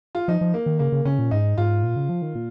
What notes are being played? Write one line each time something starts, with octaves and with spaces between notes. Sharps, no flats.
F4
F3 D#4
F3
A#3
D#3
C#3 A#3
C#3
C#3 C#4
A#2
G#2 D#4
G#2 F4
A#2
C#3
F3
D#3
A#2